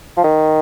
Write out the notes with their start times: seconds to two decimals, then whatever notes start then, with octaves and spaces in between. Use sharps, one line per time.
0.17 F3
0.24 D#3